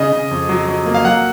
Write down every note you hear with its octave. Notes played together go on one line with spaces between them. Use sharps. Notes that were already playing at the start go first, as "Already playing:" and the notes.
Already playing: C#3 D#5
C#3
F2
F#3
F#3
A#3
F5
F#3 F#5